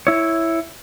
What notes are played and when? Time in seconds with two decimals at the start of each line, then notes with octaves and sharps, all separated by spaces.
0.07 E4 C#5